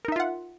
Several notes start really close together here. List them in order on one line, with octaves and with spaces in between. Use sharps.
A#4 D#4 E5 F4 F#5